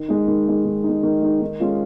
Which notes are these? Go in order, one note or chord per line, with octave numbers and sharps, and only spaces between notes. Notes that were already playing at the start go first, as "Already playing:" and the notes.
Already playing: D#3
G#3 D#4
D#3
G#3 D#4
D#3
D#4
G#3
D#3
G#3 D#4
D#3
G#3 C#4 F4